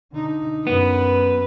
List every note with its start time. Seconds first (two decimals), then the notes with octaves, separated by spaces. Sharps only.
0.13 D3 D#4
0.67 F#2 B3 B4